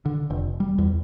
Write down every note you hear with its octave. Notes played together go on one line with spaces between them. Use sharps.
D3
F1
G3
E2